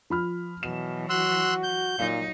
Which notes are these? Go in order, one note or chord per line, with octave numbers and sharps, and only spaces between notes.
F3 B5 F6
B2 E3 F#3 E7
F#4 C6 E6 F#6
G6
A#2 F#3 D#4 F5